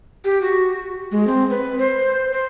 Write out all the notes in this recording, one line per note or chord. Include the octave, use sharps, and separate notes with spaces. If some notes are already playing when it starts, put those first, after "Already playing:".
G4
F#4
G#3
C4
B4
C5
C5